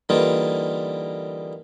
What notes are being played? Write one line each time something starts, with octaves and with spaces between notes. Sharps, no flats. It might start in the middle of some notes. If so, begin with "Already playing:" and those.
D3 E3 G3 A#3 D#4 F4